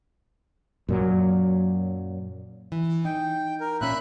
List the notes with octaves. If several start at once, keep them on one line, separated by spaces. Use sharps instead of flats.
F#2 A#2 F#3
E3
D#4 G5
A#4
A#2 C#4 E5 B5 F#6